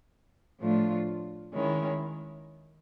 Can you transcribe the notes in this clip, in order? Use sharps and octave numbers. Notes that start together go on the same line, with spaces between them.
A2 F3 A3 D4 F4
D#3 G#3 C#4 E4